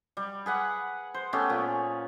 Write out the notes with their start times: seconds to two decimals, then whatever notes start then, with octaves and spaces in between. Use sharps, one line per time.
0.17 G3
0.46 G#4 B4 F#5
1.14 C5
1.33 A3 B3 C#4 G4
1.49 A#2 G#4